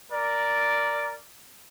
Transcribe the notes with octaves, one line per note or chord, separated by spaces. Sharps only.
A#4 D5